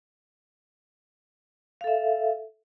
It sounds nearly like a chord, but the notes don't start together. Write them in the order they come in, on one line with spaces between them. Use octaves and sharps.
F5 A4 E5